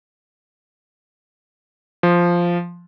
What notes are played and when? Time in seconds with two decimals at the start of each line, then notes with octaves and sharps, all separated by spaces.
2.03 F3